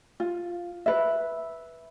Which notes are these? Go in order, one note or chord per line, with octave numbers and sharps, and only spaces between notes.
F4
B4 E5